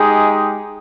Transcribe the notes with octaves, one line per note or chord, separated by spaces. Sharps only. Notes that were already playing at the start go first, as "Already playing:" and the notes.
Already playing: G#3 D#4 G4 G#4